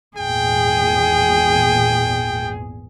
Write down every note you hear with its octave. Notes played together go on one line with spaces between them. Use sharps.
G#1 E2 A#2 G#4 G5